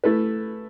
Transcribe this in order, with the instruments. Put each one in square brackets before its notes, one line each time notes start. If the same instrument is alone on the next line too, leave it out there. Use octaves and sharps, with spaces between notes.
[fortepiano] A3 E4 B4